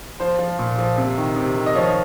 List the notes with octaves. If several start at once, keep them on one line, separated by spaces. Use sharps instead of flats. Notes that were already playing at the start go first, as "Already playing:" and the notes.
F3 C5
F3
A#2
F3
C3
D#3
C3
D#3
D#5
F3 C#5